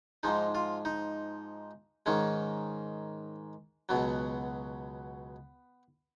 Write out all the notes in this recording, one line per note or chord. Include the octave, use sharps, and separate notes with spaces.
G#2 F3 G#3 D#4
F4
D#4
G#2 D#3 G#3 C#4
C#2 B2 F#3 B3